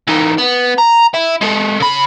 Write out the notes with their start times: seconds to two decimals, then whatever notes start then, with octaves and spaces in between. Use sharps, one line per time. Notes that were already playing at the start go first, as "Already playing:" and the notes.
0.07 E3 D#4
0.38 B3
0.78 A#5
1.14 E4
1.41 G#3 A4
1.80 C#3 B5